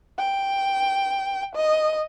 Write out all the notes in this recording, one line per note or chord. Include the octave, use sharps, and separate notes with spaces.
G5
D#5